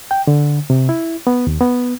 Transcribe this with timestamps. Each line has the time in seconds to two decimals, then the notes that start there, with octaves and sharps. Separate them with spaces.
0.11 G5
0.27 D3
0.70 C3
0.89 E4
1.27 B3
1.47 D#2
1.61 B3